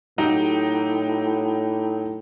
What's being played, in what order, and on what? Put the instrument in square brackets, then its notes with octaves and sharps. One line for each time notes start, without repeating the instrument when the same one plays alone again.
[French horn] A2 [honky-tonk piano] F#3 D#4 G4